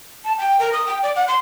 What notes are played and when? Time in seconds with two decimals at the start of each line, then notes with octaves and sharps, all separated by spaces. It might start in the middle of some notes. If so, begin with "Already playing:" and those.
0.25 A5
0.38 G5
0.60 A#4
0.73 D#6
0.87 G5
1.03 D5
1.16 F#5
1.28 C6